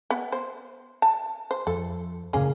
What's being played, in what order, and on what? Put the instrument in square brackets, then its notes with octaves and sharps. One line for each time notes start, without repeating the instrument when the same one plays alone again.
[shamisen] B3
C5
A5
C5
[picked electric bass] F2 [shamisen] A4
[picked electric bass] F#2 A2 C#3 [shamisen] A#3 C#4 G#4